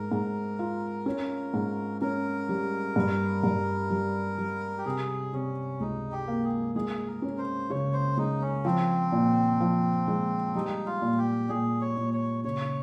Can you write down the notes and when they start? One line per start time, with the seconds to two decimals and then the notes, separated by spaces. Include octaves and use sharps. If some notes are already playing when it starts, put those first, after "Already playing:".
Already playing: G#2 A#4
0.12 G#2
0.59 F4
1.06 C#4
1.54 G#2
2.01 C#4 A#4
2.49 G3
2.96 G2
3.43 G2
3.90 G3
4.38 G3
4.79 G4
4.85 C3 G#4
5.33 C3 C#4
5.80 C#2 D#4
6.12 G4
6.28 A#3
6.44 G#4
6.75 G#3 G#4
7.07 A#4
7.22 C#4
7.38 C5
7.70 C#3 C#5
7.93 C5
8.17 G#3 D#4
8.42 C#4
8.65 F3 C4
9.12 A#2
9.60 F3
10.08 G#3
10.55 G3 D#4
10.86 F4
11.02 A#2
11.18 G4
11.49 A#2 G#4
11.81 C#5
11.97 A#2
12.13 C#5
12.44 C#3 C#5